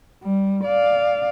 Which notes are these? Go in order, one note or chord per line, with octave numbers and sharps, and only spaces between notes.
G3
D5 F5